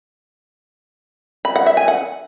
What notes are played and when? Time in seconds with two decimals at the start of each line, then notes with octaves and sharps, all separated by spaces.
1.45 B5
1.56 F#5
1.66 E5
1.77 G#5
1.88 F#5